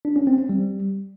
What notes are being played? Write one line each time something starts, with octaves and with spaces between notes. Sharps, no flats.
D4
C#4
C4
C4
G3